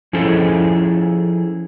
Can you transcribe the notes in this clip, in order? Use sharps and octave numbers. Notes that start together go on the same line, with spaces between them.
F3 C#4 E4 G#4 A4 C5